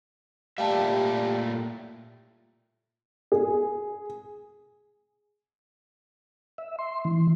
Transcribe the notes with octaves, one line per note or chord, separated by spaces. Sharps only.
A#2 G3 A3 E5 F5 G5 A5
G#4
E5
C6
E3